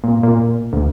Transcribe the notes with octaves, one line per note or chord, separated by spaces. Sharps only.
A#2
A#2
D2